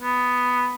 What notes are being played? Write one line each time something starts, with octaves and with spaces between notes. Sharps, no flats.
B3